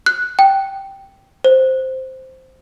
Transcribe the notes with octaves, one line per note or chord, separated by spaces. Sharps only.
F#6
G5
C5